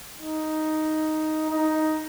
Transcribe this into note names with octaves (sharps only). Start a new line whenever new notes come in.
D#4
D#4